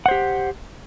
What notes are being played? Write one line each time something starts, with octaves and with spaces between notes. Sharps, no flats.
G4 C5 F#5